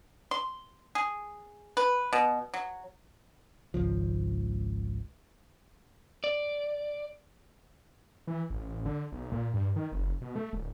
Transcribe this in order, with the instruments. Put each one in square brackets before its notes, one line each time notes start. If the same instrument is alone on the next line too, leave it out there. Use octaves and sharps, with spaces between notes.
[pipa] C6
G#4
B4
B2
F#3
[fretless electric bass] G#1 C#2 F3
[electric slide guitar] D5
[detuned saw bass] E3
A1
D3
B1
A#2
G2
D#3
F#1
B2
A3
D1